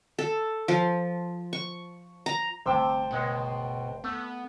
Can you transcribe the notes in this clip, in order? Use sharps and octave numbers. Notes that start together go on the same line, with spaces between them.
A4
F3
C#6
A#5
G1 D2 C3 C5 G5 A5
C#2 B2 G#3 F#5
A3 B3